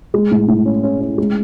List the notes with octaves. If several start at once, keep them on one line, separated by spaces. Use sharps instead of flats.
G#3
A2
A2
C#4
C#4
C#4
G#3